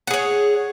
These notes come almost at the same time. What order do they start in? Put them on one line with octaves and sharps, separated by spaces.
F#5 G#4 C#5